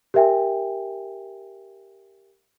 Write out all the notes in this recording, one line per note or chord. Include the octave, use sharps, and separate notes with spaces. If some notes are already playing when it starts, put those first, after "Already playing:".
G4 A#4 E5 G5 G#5